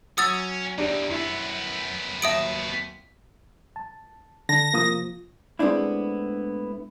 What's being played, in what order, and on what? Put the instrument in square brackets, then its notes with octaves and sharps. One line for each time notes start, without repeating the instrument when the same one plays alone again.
[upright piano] F#3 [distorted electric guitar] C#4 [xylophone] D#6 E6 A6
[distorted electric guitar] E2 D#3 [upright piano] D4 G4 D7
[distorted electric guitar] F#2 B3 [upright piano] E4
[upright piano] D#2 F#3 [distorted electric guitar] B3 A5 [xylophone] E5 D#6 D7
[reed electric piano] A5
[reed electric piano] D3 [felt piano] A5 [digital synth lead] A#6
[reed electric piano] C3 A#3 [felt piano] F3 D#6
[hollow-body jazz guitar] A2 G#3 B3 C4 D4 E4